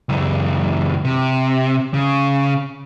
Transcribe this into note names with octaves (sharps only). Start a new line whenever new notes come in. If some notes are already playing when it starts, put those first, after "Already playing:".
C#2 F#2
C3
C#3